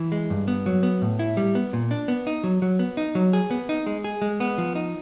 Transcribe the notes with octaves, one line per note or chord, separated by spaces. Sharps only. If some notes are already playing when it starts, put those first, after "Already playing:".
Already playing: E3
G#3
G2
B3
F#3
B3
A2
E4
G3
B3
A#2
D4
B3
D#4
F#3
F#3
B3
D#4
F#3
G#4
B3
D#4
G#3
G#4
G#3
B3
F3
D#4